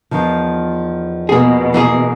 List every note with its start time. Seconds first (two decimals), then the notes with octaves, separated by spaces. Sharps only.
0.11 E2 D#3 F3
1.29 B2 A#3 G#4
1.74 E3 A#3 G#4